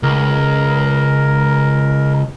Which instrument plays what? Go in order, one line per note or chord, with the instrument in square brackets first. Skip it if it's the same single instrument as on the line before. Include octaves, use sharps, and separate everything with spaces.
[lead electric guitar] C#2 [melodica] A#4